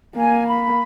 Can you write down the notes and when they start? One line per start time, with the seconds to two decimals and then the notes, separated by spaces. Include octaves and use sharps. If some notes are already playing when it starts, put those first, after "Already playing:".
0.16 A#3 G#5
0.47 B5